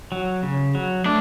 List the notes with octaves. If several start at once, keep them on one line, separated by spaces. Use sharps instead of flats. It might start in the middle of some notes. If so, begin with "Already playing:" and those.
F#3
C#3
F#3
A3 D4